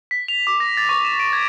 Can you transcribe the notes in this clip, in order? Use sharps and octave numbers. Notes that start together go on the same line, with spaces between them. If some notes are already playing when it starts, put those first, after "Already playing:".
B6
F7
D6
A#6
A6
C#6
E7
D7
G#6